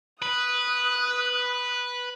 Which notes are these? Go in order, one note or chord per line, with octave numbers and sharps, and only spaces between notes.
B4 D#6 F#6